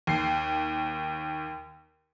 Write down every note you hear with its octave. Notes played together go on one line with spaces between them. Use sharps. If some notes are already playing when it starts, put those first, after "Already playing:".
D#2 C7